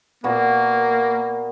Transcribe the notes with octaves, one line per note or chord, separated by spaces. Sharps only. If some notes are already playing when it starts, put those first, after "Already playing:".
A#2 A#3 B3 F#4